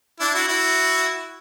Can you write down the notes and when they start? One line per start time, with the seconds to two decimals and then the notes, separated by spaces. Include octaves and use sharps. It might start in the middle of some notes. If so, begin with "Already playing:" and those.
0.20 D4 E4
0.34 E4 F#4
0.48 E4 F#4